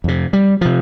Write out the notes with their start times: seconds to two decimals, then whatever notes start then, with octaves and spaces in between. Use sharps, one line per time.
0.04 F2 C3
0.33 G3
0.61 C3 F3